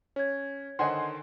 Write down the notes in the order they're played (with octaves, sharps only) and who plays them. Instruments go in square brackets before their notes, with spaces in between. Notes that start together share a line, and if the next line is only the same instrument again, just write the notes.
[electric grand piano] C#4 [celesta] C#5 G#6
[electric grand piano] D3 D#3 C5 [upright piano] D#5 F#5 [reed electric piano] G#5 C6